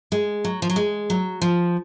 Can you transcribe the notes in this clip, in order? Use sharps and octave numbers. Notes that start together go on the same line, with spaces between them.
G#3
F#3
F3
F#3
G#3
F#3
F3